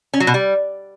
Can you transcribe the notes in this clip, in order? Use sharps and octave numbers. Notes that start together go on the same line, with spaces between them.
C#4
F#3
B2
G3